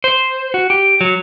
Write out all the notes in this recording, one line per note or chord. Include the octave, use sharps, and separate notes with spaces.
C5
F#4
G4
F#3